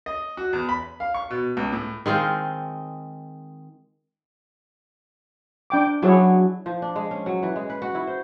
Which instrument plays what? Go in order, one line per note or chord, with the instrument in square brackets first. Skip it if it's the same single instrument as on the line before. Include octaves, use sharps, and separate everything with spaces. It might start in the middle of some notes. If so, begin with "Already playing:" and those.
[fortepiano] D#5
F#4
E2
B5
F5
C#6
B2
C#2
A2
[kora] D#3 G#3 C4 F4
[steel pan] D4 G5 D6
[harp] F#3 D4 [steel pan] E4 G#4 C#5
[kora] F3
D4
G#3
C#4
F#3
E3
G#3
B4
F#4
E4
C5